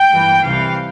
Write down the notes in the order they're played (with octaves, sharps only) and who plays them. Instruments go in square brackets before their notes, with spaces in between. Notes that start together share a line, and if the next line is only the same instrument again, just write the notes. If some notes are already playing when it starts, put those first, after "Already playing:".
Already playing: [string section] G5
G2 E3 A#3
C2 C3 E3 F5